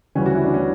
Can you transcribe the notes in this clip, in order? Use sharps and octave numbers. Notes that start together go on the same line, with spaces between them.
D2 C#3 E3 G3 C#4
F#4
E4
D4
C#4